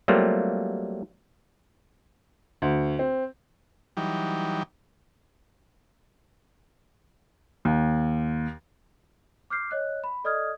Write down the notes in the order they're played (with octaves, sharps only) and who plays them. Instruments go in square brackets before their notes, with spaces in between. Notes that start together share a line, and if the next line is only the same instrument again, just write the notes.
[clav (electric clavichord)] F#3 G3 A3 A#3 C4 F4
[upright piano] D2
C4
[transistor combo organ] E3 F#3 G3 D#4 G5
[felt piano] D#2
[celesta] D6 F6 G6 C7
C#5 D#5 F#6
B5
A4 D5 D#5 D#6 F6 G#6